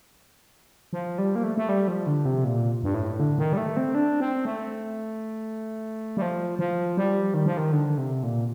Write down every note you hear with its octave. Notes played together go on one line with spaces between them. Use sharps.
F3
G3
A#3
A3
A3
G3
F3
D3
C3
A#2
G2
A2
D3
D#3
G3
A3
C4
D4
C4
A3
G3
F3
F3
G3
D#3
F3
D#3
D3
C3
A#2